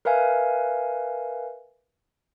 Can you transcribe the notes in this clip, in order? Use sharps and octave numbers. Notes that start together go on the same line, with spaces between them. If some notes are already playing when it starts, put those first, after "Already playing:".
A#4 B4 E5 F5 G#5